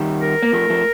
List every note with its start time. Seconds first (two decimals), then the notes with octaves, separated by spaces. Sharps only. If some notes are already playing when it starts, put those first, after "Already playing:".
Already playing: D#3 G3
0.21 A#4
0.43 A#3
0.53 F3 A3
0.70 F3 A3